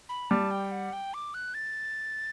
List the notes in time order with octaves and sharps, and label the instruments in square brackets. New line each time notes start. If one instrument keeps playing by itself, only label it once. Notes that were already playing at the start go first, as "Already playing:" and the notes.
[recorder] B5
[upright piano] G3 [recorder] A5
[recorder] G5
F#5
G5
D6
F#6
A6